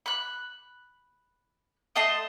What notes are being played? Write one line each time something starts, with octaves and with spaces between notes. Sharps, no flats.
B5 F#6
A3 D#5 A5 C6